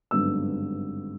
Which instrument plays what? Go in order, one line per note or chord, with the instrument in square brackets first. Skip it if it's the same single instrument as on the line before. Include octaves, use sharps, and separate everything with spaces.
[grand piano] G#1 G2 D3 F#3 B3 E6